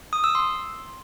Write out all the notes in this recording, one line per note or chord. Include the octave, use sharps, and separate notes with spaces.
D#6
E6
C6